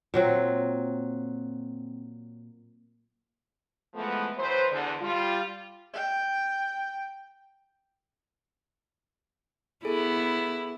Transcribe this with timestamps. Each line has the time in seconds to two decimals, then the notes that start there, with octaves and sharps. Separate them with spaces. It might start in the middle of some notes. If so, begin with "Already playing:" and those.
0.14 A#2 F#3 C4
3.95 E3 F3 G#3 A3 B3
4.38 E3 F#3 B4 C5
4.71 E2 D3
5.01 G3 F4
5.93 G5
9.85 B3 E4 G#4 A4 D7